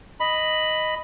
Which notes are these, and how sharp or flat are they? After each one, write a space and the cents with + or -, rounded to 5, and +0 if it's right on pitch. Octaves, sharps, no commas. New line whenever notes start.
D#5 +0 B5 +5